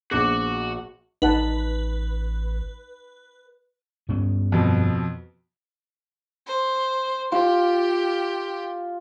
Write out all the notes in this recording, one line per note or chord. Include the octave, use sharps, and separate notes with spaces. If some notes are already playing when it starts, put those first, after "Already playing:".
A#1 B3 F#4 G#4 D6
A1 D#4 B4 F#5 A5
G2 B3 C#4
F2 B2
C5
F4 G4